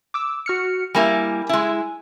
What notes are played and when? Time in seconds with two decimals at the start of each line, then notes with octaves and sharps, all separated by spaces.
0.14 D6 E6
0.46 F#4 F6 C#7
0.95 G3 A#3 E4 G#5
1.49 G#3 E4